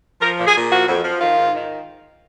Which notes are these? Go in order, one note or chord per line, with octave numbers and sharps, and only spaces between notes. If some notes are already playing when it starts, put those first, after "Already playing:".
F3 A#4
A#2
G#4
A#2
F3 F#4
F2
F3
D#3 F4
G#2
D#3